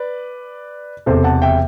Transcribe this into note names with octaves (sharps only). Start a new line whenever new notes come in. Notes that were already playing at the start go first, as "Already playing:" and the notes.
Already playing: B4 D5
E1 E2 C3 A4 C5
F#5 A5
E5 G5